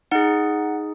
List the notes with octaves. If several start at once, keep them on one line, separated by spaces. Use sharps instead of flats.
D#4 G#4 F#5